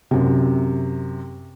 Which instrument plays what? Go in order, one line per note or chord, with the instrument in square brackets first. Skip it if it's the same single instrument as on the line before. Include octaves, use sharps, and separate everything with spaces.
[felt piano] F#2 C3